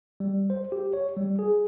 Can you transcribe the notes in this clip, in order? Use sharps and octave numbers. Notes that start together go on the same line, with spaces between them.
G3
C5
G4
C#5
G3
G#4